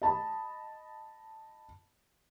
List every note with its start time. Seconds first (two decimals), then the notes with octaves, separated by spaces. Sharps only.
0.02 D#5 A5 B5